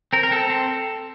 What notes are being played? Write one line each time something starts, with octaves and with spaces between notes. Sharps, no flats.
C4 A#4
A#4
C4 A4
C4